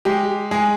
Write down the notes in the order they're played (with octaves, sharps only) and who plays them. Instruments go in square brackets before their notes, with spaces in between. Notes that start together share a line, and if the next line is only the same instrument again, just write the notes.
[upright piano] G#3 G4
G#3 G#4